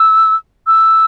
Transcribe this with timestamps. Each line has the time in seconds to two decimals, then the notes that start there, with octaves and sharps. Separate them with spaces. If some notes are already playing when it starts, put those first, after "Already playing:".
Already playing: E6
0.67 E6